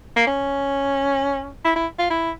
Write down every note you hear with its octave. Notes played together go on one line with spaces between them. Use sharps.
A#3
C#4
E4
E4
F4
E4